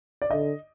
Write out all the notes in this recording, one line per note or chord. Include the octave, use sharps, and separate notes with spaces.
D5
D3 D#5